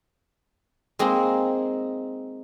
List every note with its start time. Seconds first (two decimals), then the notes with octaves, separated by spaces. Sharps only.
0.99 G#3 A#3 C4 D#4